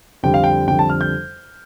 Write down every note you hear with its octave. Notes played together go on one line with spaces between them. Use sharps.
F2 D3 G3 G5
F5
G5
F2 D3 G3 G5
A5
F6
G6